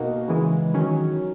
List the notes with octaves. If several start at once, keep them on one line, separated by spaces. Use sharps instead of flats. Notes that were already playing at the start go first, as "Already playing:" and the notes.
Already playing: B2 A#3 D#4 F#4
C#3 E3 G#3
D#3 F#3 C#4